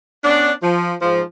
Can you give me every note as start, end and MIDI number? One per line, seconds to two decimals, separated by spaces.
0.24 0.51 59
0.24 0.51 61
0.24 0.51 62
0.62 0.93 53
1.01 1.22 44
1.01 1.22 53